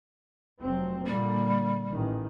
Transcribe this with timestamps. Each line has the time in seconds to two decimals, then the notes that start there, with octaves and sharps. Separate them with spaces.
0.61 F1 F#3 C4
1.07 A#2 D3 G3 A#3
1.90 A1 D#3